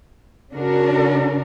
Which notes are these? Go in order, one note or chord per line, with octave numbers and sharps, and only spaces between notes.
C#3 D4 F#4 A#4